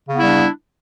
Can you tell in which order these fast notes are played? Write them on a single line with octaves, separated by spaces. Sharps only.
C#3 B3 E4 G3 D4